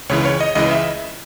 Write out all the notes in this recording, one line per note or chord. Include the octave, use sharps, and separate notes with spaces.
C#2 C#3 E3 C#5
C#5
D#5
C#2 C#3 E3 D#5
E5